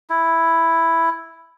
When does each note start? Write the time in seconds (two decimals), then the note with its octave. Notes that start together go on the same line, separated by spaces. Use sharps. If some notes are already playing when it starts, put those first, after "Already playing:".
0.10 E4